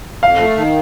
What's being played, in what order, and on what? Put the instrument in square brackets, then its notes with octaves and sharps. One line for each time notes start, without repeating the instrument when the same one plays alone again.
[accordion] F2 [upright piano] F5
[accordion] A3
D#3